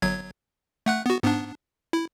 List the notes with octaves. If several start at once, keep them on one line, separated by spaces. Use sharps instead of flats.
G1 F#3 G#6
A3 F#5 F#6
B3 F#4
G#2 B3 D4
E4